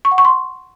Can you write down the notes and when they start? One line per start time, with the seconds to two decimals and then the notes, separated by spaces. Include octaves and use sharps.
0.05 C#6
0.11 F#5
0.18 C#6
0.25 C6